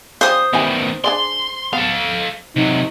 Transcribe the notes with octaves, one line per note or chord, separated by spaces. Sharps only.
F3 G3 C#4 C5 D#6
B2 D#3 E3 G3 G#5
D4 G#4 D5 C6
B3 A4 F5
C3 F#3 D#4